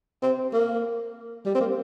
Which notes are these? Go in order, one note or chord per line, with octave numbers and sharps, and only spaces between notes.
C4
A#3
G3
C4
A#3